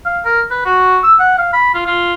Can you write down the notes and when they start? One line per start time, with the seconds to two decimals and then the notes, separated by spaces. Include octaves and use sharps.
0.06 F5
0.25 A#4
0.51 B4
0.65 F#4
1.04 E6
1.19 F#5
1.38 F5
1.53 B5
1.75 F4
1.87 F4